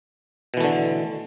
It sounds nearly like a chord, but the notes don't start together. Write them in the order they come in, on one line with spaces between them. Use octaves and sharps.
B2 E3 A3 D3